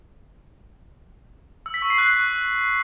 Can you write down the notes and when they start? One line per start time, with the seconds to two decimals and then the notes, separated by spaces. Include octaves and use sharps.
1.66 E6
1.74 B6
1.82 C#6
1.90 C7
1.98 F#6